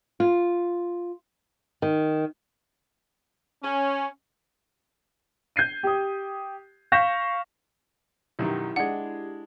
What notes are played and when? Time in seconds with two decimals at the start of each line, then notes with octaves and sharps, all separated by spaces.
0.20 F4
1.82 D#3
3.63 C#4
5.56 G6 G#6 C7 D#7
5.83 G4 D#6
6.92 F5 C#6 G6 A#6 B6 E7
8.39 B1 F#2 D#3 E4 G4
8.76 G#3 D4 F#5